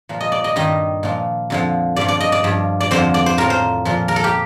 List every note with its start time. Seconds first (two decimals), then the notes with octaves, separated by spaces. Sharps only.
0.09 A#2 F3
0.21 D#5
0.32 D5
0.44 D#5
0.56 G2 D#3 G3 D#5
1.03 A#2 F3
1.50 F2 D3 F3
1.96 G2 F3 D5
2.08 D5
2.20 D#5
2.32 D5
2.44 G2 F3
2.81 D5
2.91 F2 D3 F3 C5
3.14 D5
3.26 C5
3.38 A2 F3 A#4
3.50 C5
3.85 A#2 F3
4.08 A#4
4.16 A4
4.24 G4